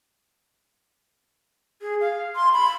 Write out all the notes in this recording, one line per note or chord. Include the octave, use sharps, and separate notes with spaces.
G#4
F5
C6
B5